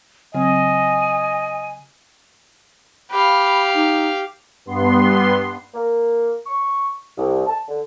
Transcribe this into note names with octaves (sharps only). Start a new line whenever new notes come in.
C#3 F#3 C4 D#5 G#5
G4 F5 B5
D#4
G2 B3 C6
A#3
C#6
C2
A5
D3